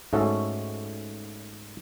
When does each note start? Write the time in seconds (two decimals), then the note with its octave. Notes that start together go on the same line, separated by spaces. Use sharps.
0.13 G#2 A3 C#4 F#4 A4